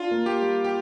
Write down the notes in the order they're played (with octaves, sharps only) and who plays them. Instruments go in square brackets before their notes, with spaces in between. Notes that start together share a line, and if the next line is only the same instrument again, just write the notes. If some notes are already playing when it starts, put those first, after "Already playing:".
Already playing: [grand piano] D4 [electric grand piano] F4
[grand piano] A#3
[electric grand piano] G4
[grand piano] G3
[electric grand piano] G4